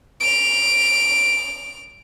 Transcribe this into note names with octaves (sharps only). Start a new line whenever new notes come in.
D7 F7